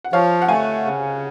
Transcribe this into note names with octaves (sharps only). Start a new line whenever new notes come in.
F#5
F3 C#5 F5
F#5
A3 F5 G#5
C#3